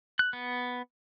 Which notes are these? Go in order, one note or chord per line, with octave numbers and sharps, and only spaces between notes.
F#6
B3